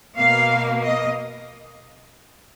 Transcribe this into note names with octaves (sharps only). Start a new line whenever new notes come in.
B2 A#3 F5
D#5